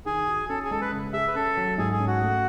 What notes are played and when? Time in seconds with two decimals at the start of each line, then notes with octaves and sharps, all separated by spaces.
0.06 D#3 G#4
0.27 F#4
0.49 C#4 A4
0.64 G#4
0.71 G#3 A4
0.82 B4
0.92 C#3
1.13 G#4 E5
1.28 B4
1.35 C#4 A4
1.57 F#3
1.78 G#2 G#4
1.92 G#4
2.00 C#4
2.07 F#4
2.21 A3